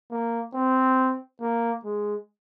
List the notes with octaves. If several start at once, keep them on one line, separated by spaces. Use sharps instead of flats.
A#3
C4
A#3
G#3